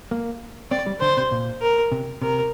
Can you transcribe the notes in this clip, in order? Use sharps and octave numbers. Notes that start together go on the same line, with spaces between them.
A#3
C4 D5
G3
D3 C5
C3
A#2
A#4
C3
C3 A#4